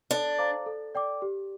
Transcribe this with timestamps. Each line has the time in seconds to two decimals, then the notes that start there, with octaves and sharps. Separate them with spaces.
0.11 D4 A4
0.39 C5 F5 A#5 D6
0.66 A4
0.95 D5 G5 D6
1.22 G4